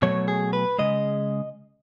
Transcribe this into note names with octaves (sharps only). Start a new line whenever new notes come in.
B2 F#3 A3 C#5
G#4
B4
C#3 G#3 D#5